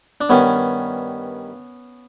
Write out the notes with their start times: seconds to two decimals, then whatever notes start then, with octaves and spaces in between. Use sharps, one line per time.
0.21 D4
0.29 G2 D#3 B3 C#4